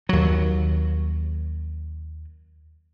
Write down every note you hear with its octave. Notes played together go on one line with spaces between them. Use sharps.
D#2 F#3